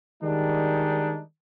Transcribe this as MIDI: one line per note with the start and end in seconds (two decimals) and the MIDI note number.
0.23 1.21 51
0.23 1.21 55
0.23 1.21 56
0.23 1.21 62
0.23 1.21 63